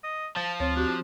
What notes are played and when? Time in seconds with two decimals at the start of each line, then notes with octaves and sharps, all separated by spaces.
0.03 D#5
0.36 F3 A5
0.60 D2 C4 F4 C5 C#5
0.76 C4 D4 F#4 G4